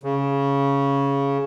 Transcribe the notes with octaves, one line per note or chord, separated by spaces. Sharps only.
C#3